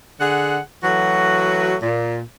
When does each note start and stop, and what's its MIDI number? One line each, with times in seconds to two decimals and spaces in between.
0.20 0.58 50
0.20 0.58 68
0.20 0.58 78
0.84 1.75 52
0.84 1.75 54
0.84 1.75 57
0.84 1.75 66
1.83 2.20 46